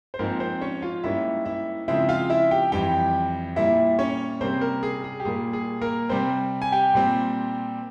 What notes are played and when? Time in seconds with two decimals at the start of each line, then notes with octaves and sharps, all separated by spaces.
0.14 C5
0.19 G#2 F3 A#3 C4 A#4
0.40 C4 C5
0.61 C#4 C#5
0.82 F4 F5
1.04 G#2 G3 A#3 C#4 E4 E5
1.45 E4 E5
1.88 C#3 F3 G#3 C4 E4 E5
2.09 F4 F5
2.30 E4 E5
2.51 G4 G5
2.72 F2 E3 G3 G4 G5
3.56 A#2 G3 A#3 E4 E5
3.99 C#4 C#5
4.41 C3 G3 A#3 C4 C#4 C5
4.61 A#3 A#4
4.83 G#4
5.04 G#4
5.20 G4
5.25 A#2 G3 A#3 G#4
5.53 G#4
5.81 A#3 A#4
6.09 C3 G3 C4 C5
6.62 G#5
6.72 G4 G5
6.94 A#2 G3 C4